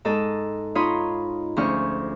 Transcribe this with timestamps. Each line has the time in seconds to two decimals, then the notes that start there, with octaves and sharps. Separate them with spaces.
0.05 G#2 A4 D#5 A5
0.75 D#4 F4 C#5 B5 C6 D#6
1.56 D2 F3 C#4 G#4 C#6 F6